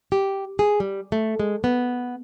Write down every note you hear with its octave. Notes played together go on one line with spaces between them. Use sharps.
G4
G#4
G3
A3
G#3
B3